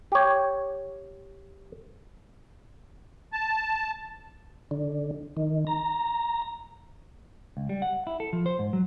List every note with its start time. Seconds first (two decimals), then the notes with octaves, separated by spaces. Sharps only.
0.12 G4 C#5
3.33 A5
4.71 D3
5.37 D#3
5.67 A#5
7.57 C#2
7.69 G3
7.82 F#5
8.07 E4
8.20 A4
8.33 F3
8.46 C5
8.59 G#2
8.73 F#3